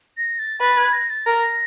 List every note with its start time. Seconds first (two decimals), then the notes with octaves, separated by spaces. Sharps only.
0.18 A#6
0.39 A6
0.61 B4 A6
0.77 G#6
0.93 A#6
1.10 A6
1.26 A#4 A#6